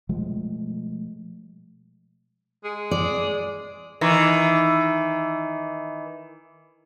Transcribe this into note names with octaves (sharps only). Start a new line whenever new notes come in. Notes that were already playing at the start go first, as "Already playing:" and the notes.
B2 F3 G#3 A3
G#3
D5
D#3 E3